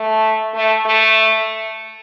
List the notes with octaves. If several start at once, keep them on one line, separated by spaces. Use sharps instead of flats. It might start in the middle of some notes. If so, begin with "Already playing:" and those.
Already playing: A3
A3
A3